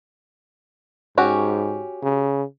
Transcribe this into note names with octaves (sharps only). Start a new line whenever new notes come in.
G#2 C#4 F#4 G4
C#3